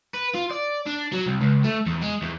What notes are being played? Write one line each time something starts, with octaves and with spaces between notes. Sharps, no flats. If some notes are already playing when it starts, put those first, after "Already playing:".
B4
F4
D5
D4
F#3
C2
C#2
A3
E2
G#3
E2